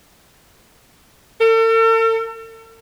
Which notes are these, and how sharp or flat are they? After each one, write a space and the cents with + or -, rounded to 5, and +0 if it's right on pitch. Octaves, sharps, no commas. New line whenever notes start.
A4 +45